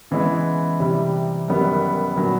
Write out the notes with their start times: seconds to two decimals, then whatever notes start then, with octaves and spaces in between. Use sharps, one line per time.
0.11 C#3 E3 G#3 B3 E4
0.80 C3 E3 G3
1.48 F#2 D#3 G3 B3
2.16 A#2 F#3 B3